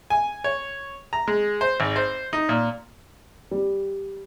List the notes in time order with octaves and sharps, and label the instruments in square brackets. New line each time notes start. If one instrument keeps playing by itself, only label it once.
[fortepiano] G#5
C#5
A#5
G#3
C5
G#1
C5
D#4
A#2
[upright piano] G3